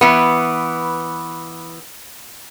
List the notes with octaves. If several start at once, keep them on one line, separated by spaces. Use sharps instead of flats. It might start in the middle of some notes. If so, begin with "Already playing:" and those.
E3 B3